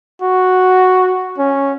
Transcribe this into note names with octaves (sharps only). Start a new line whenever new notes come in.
F#4
C#4